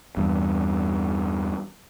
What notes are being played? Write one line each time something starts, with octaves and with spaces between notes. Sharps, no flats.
E2 G2